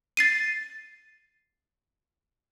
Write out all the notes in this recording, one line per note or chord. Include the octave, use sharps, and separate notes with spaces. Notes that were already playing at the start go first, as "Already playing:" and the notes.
A6 C7 D#7